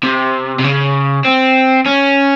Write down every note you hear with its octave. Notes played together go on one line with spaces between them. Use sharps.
C3
C3
C#3
C4
C#4